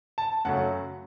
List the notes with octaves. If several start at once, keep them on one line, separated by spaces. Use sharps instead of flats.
A5
F#2 C#3 F#3 A3 F#5